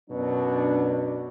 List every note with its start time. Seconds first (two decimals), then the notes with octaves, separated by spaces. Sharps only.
0.10 F#2 B2 F#3 D4